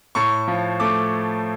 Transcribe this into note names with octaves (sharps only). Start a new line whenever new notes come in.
A2 C#6
F3
A3 D6